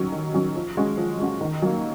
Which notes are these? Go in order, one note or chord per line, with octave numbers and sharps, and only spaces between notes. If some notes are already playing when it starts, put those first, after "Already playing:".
Already playing: D#3 F#3 C#4
D#3
F#3 C#4
F3
G#3 C#4 F#4
F3
G#3 C#4 F#4
D#3
F#3 A#3